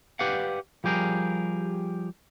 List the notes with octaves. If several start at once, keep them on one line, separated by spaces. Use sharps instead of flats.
G4 B4 D5 F5 F#5
F3 G3 G4 G#4 A#4